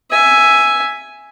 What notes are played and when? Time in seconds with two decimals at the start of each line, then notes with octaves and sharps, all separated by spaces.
0.10 E5 G#5